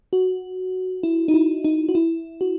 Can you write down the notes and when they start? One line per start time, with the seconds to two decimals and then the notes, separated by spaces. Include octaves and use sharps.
0.13 F#4
1.03 E4
1.28 D#4
1.34 E4
1.64 D#4
1.89 F#4
1.95 E4
2.41 F#4